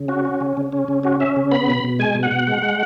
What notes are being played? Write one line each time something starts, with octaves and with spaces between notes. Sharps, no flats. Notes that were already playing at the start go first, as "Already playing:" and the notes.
Already playing: C#3
C#4 F#4
C#4
C#3
C#3
C#4
C#3
C#4 F#4
C#4 E5
C#3
B3 B5
B2
B2
G#3 G#5
B2
F#5
B2
G#3
G#3